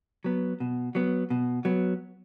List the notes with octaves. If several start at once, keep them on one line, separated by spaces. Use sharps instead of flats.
F#3 B3
B2
F#3 B3
B2
F#3 B3